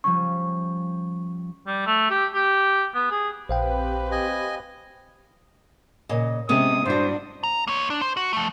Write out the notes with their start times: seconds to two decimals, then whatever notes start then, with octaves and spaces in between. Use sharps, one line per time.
0.04 F3 G3 C#4 C#6
1.66 G3
1.86 A3
2.10 G4
2.34 G4
2.94 B3
3.10 G#4
3.49 A#1 C4 G4 B4 C5 F5 G5
4.11 D#5 G#5
6.09 A#2 C#3 D#5
6.49 C3 G#3 B3 C#4 D#6
6.86 G2 D4 F#4 C5
7.44 A#5
7.67 A#3 C#5
7.90 D4
8.01 C5
8.17 F#4
8.33 F3 A3